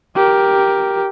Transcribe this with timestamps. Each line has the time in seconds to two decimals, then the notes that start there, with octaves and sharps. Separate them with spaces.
0.16 G4 A#4